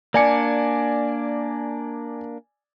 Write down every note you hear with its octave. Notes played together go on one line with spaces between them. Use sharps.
A#3 D4 D5 G#5 C#7